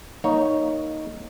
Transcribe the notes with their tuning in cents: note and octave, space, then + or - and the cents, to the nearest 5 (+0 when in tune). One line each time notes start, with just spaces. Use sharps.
A#3 -5 D#4 +0 C#5 +0